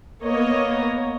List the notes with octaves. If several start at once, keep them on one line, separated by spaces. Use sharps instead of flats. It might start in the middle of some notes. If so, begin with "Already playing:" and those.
A#3 B3 C#5 D#5